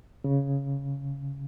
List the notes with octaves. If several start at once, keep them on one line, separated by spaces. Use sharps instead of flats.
C#3